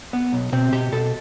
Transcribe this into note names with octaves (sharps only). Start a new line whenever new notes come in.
B3
B1
B2 C4
B2 G4
B2 A4